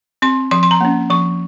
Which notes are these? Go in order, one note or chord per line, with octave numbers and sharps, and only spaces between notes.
C4 C6
F3 C6
C6
A#5
A#3 C#4
F3 C#6